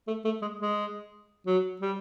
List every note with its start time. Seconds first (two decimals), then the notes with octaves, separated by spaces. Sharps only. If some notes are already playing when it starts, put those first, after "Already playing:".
0.07 A3
0.25 A3
0.42 G#3
0.60 G#3
1.47 F#3
1.81 G3